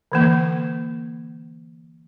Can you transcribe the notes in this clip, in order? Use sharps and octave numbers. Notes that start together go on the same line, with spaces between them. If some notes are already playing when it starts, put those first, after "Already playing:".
D3 E3 A#3